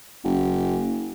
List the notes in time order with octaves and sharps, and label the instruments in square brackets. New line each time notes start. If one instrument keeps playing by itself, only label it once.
[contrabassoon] F#1